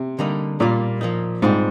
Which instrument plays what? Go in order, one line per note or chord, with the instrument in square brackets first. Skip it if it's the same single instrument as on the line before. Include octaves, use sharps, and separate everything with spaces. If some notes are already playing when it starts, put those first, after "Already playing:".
Already playing: [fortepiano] C3
[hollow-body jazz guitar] D3 G3 A#3 D#4
[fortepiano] A#2 [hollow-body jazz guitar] G3 A#3 F4
[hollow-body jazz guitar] F3 A#3 D#4
[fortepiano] G#2 [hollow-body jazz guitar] G3 C4 F4